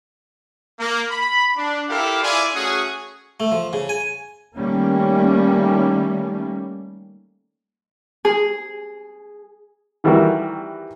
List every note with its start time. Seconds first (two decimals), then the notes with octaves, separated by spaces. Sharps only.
0.80 A#3
1.11 B5
1.57 D4
1.89 E4 G4 A4 A#4 F5
2.23 E4 F4 D5 G#5
2.54 A3 C#4 F#4 G#4
3.40 A3
3.52 F3
3.73 C#3
3.89 G#5
4.56 D#3 G3 A3 A#3 C#4
8.25 G#4
10.04 D#3 E3 G3 A3 F#4 A#4